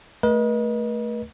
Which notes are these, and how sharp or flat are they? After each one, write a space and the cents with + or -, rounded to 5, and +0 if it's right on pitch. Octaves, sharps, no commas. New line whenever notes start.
A3 +0 B4 -45 D#5 +0